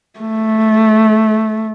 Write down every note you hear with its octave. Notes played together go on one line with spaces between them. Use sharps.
A3